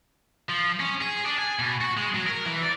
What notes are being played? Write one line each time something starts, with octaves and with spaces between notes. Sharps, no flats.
F3
C#4
G#4
D4
G#5
B2
F#4
G#3
F#3
A#4
E3
D5